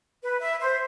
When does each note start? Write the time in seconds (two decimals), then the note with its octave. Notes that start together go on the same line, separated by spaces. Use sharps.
0.23 B4
0.40 E5
0.61 C5